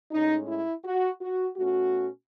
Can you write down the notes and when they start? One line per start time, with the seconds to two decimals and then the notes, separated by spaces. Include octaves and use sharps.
0.12 A2 G#3 C#4 D#4
0.48 E4
0.84 F#4
1.21 F#4
1.57 B2 A3 C#4 F#4